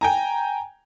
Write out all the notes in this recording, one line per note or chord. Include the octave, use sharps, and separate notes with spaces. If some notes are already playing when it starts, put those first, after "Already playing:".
G5 G#5 A#5